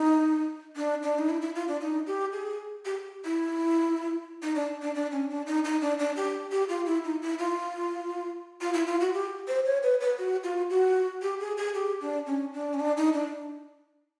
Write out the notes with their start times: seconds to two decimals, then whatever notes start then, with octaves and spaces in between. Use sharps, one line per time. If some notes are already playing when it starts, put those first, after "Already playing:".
Already playing: D#4
0.76 D4
1.03 D4
1.18 D#4
1.29 E4
1.42 E4
1.55 F4
1.68 D4
1.81 D#4
2.07 G4
2.33 G#4
2.85 G4
3.25 E4
4.43 D#4
4.55 D4
4.82 D4
4.95 D4
5.12 C#4
5.30 D4
5.47 D#4
5.65 D#4
5.81 D4
5.99 D4
6.16 G4
6.52 G4
6.69 F4
6.86 E4
7.04 D#4
7.22 E4
7.39 F4
8.61 F4
8.74 E4
8.87 F4
9.00 F#4
9.13 G4
9.48 C5
9.66 C#5
9.83 B4
10.01 B4
10.18 F#4
10.44 F4
10.70 F#4
11.22 G4
11.40 G#4
11.57 G#4
11.74 G4
12.01 D4
12.27 C#4
12.53 D4
12.74 C#4
12.80 D4
12.97 D#4
13.14 D4